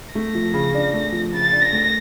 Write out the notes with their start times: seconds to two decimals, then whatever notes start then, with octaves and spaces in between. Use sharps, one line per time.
0.15 A3 A#6
0.35 F3
0.54 C#3
0.74 D4
0.93 A3
1.12 F3
1.33 C#3 A6
1.52 D4
1.62 A#6
1.72 A3